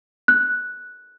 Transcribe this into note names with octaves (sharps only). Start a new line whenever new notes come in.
F#6